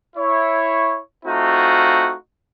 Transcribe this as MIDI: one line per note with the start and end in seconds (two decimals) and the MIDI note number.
0.17 0.98 64
0.17 0.98 73
1.26 2.14 57
1.26 2.14 60
1.26 2.14 63
1.26 2.14 65
1.26 2.14 66